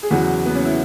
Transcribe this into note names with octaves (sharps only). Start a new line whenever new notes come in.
G#4
E2 C#3 F#3 F#4
B3
C#4
E4